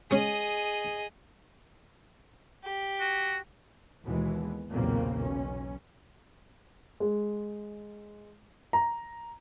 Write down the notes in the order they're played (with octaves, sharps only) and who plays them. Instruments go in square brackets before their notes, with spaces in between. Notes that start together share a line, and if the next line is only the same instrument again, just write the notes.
[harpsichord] G#3 C#4 [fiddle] G#4 D#5
[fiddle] G4
[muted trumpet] F#4
[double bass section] D#2 B2 E3 G#3
B1 E2 A#2 C#3 A#3 C4
B1 C#4
[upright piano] G#3
A#5